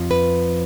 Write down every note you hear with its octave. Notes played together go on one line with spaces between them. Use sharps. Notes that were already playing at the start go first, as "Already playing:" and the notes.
Already playing: F2 F3
B4